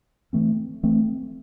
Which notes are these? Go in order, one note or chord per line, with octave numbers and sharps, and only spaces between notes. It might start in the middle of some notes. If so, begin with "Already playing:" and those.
E3 A3 C4
E3 A3 C4